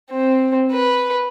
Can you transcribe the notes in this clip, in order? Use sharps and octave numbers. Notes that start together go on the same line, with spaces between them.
C4
B4